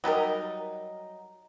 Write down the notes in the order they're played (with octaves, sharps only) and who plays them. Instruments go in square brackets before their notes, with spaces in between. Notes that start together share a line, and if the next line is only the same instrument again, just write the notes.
[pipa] F#3 G3 D#4 A#4